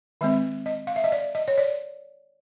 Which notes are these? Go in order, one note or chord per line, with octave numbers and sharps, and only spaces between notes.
D#3 G#3 C4 E5
D#5
F5
E5
D#5
D5
D#5
C#5
D5